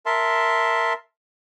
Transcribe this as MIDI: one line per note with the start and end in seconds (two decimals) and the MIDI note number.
0.06 0.93 70
0.06 0.93 76
0.06 0.93 81
0.06 0.93 84